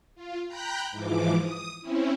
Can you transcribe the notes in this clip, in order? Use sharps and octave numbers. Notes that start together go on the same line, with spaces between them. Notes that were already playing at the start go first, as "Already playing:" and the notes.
F4
G5 A#5 B5 F#6 G6
G#2 E3 F3 D6
D#6
C4 C#4 E4